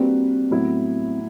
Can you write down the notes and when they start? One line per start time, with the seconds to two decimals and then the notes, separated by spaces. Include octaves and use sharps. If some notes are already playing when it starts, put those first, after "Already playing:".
Already playing: G3 A#3 C4 D4 F#4 B4
0.51 A2 F#3 B3 E4